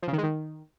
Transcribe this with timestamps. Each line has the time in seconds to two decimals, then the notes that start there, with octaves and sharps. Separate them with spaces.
0.02 F3
0.08 C#3
0.13 D#3
0.18 G#3
0.23 D#3